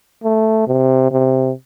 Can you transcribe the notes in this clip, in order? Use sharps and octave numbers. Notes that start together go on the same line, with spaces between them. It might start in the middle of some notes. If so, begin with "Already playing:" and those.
A3
C3
C3